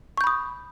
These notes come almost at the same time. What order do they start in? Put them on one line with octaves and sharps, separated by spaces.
C#6 G6 B5 D#6